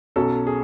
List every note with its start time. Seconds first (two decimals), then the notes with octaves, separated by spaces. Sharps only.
0.16 B1 B2 F#3 C#4 A4
0.47 G#4